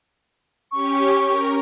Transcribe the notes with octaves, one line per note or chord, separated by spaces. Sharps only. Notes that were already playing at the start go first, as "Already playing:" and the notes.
C#4 G4 C#6
A#4